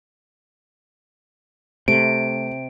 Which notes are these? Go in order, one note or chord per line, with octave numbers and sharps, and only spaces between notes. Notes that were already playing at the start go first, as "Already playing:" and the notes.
C3 A3 D7